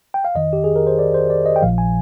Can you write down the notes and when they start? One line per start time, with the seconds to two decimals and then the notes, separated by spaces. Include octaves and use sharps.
0.14 G5
0.25 F5
0.35 F2 D#3 D#5
0.53 G4
0.64 G#4
0.76 A#4
0.87 C5
0.99 D5
1.14 C5
1.30 D5
1.46 D#5
1.56 G5
1.62 A#1 A#2 F3 F5
1.78 G#5